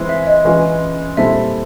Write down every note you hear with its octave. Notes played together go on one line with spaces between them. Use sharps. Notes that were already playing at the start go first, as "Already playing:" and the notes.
Already playing: E3 G#3 C4 E4
E5
D#5
E3 G#3 C#4 F4
A#2 G3 C4 E4 A4 E5